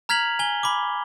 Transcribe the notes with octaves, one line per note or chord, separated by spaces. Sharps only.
A#5 F6 G#6 B6 F7 F#7
G#5 G7
B5 D6